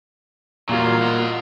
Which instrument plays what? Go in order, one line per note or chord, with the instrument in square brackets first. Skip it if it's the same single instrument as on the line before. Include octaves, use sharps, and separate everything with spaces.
[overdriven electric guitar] E2 F#3 [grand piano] A#2 G3 [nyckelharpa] F4
[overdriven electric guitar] D#5 F#5